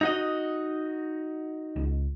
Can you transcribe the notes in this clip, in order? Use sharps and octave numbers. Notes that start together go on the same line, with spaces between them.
D#4 F#4 D#5
C#2